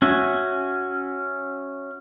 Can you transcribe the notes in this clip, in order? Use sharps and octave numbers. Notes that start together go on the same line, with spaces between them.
C#4 F#4 E5 G#5